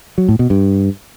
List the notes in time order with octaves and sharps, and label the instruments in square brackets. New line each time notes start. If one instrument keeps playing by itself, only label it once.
[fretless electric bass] F#3
A2
B2
G2